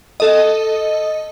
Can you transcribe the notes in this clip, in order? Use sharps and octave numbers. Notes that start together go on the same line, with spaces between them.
A4 D#5